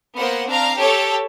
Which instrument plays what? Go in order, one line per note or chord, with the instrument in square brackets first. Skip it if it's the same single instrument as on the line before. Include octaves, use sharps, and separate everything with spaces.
[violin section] A#3 B3 C5 F#5
C4 D4 F5 A#5
G4 A4 C#5 A5